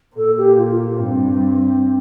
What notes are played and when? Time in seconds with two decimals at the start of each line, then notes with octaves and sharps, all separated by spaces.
0.16 A#2 A4
0.37 G4
0.57 F4
0.78 A#3
0.98 G2 C4